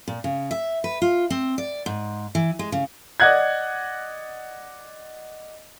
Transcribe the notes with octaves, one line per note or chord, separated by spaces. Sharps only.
A#2
C#3
E5
B4
F4
C4
D5
G#2
E3
G#3
C#3
D5 D#5 F#5 F#6 G#6